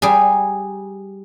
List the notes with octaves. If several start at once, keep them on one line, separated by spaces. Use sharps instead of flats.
G3 G#4